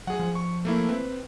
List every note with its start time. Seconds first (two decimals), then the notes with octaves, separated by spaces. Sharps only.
0.07 F#3 G#4 F#5
0.20 F3
0.35 C#6
0.65 A3 A#3 E4
0.89 C4 B4